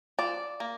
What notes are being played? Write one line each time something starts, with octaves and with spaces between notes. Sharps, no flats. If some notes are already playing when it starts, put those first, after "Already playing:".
F3 D5
A#3